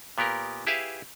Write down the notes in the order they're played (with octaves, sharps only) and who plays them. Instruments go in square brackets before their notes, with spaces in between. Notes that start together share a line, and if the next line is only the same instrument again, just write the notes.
[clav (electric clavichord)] A#2 B3 G4 A#4
E4 G4 G#4 B4 E5 F5